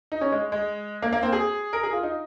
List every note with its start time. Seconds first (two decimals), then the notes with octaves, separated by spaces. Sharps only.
0.12 D#4
0.21 C#4
0.32 G#3
0.52 G#3
1.02 A#3
1.13 A#3
1.23 C4
1.33 G#4
1.73 A#4
1.83 G#4
1.93 F4
2.03 D#4